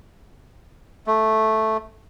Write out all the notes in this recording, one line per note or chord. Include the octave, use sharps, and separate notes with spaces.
A3